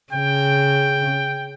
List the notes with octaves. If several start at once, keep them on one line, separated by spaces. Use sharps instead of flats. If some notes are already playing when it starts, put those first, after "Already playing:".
C#3 G5